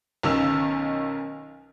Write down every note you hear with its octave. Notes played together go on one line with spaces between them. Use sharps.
B1 D#3 C#4 E6 F7